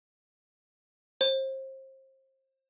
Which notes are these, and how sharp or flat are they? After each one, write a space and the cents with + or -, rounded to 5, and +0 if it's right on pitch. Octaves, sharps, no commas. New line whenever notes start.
C5 +30